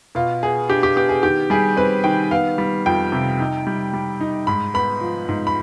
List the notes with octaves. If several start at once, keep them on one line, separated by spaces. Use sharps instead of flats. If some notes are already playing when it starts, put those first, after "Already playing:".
B2 F4
B3 G#4
D4 G4
G4
B3 G4
G#4
D#3 G4
G3 G#4
C4 B4
D#3 G5
B3 F5
G3
F2 G5
C3
D#4
G3
G3
D#4
G#2 B5
B3 B5
F3
G#2
B5